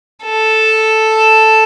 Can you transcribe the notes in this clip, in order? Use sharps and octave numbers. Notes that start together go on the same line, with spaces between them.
A4